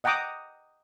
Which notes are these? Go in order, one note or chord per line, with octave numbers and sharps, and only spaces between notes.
D#5 F#5 G5 A#5 D6 D#6